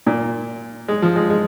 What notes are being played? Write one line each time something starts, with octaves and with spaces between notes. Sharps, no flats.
A#2
G#3
F3
G#3
G#3